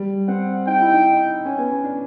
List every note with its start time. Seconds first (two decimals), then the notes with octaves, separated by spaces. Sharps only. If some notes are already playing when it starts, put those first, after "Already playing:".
Already playing: G3
0.28 C4 F#5
0.67 D#4 G5
0.81 E4
0.94 D#4
1.45 C#4 G#5
1.58 B3
1.71 C#4
1.84 D4